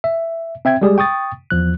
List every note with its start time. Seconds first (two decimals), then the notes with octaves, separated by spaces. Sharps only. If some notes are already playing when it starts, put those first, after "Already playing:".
0.04 E5
0.65 C4 E5 G5 G#6
0.81 G3 G#3 G4 G#4 D5
0.98 G5 C#6 D#6 A6
1.50 E2 F3 F#6